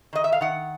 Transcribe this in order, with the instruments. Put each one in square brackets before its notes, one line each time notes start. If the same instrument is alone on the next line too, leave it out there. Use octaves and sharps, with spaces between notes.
[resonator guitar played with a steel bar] D#3 D#5
E5
F5
D#3 F#5